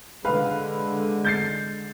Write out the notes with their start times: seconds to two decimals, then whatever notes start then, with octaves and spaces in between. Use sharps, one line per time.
0.25 D3 G#3 B4 F5
1.24 G6 A6 C7